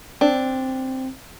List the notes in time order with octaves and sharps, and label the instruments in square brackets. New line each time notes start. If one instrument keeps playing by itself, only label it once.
[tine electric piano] C4 [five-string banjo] D4 A5